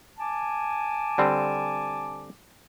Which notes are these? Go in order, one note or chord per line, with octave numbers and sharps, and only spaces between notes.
G#5 A5 D6
D3 G3 C4